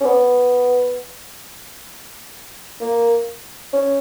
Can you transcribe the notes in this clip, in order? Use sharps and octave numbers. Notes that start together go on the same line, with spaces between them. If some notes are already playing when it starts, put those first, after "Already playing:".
C#4
B3
A#3
C#4